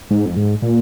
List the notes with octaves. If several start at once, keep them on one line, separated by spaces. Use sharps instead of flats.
G#2
F2
G#2
A#2